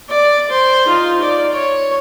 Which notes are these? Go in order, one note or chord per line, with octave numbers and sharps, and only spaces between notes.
D5
C5
D#4 F4
D5
C#5